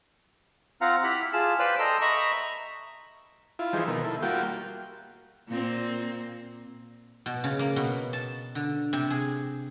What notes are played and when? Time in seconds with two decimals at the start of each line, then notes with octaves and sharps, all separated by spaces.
0.81 C4 F4 F5 F#5 A#5
1.03 E4 G4 F#5 B5 F6
1.33 F4 G#4 A5
1.59 B4 C5 D5 F5 G5 B5
1.79 A4 D#5 G5 A#5 C6 E6
2.01 D#5 E5 A#5 B5 C#6
3.59 E4 F4
3.73 E3 F3 G3 D#4 G#4 C5
3.88 B2 D#3 A#4
4.04 E4 A4
4.23 G3 A#3 F4 F#4 G5
5.48 A#2 A#3 C4
7.26 B2
7.44 C#3
7.59 A#3
7.76 B2
8.13 A5
8.55 D3
8.93 C3
9.10 G#4